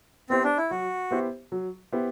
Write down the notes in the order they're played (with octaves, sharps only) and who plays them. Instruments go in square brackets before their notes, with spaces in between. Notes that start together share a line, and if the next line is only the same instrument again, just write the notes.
[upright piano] B3 E4 G4 C5 [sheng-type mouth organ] C4
[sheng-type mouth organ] D4
E4
[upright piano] F#3 [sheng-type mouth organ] F#4
[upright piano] B3 E4 G4 C5
F#3
B3 E4 G4 C5